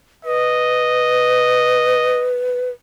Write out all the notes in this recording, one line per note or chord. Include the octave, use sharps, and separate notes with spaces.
B4 D#5